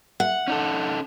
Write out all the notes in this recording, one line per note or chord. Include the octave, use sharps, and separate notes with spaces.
F#5
C#4 D#4 A4